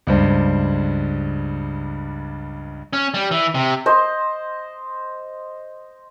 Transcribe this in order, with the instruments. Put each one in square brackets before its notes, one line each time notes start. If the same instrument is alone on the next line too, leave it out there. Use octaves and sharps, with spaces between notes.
[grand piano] C#2 G2 C5
[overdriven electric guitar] C#4
G3
E3
C3
[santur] C5 D#5